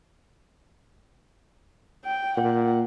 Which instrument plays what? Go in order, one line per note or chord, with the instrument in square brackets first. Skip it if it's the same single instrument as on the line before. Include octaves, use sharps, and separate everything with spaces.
[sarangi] G5
[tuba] A#2 [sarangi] F#5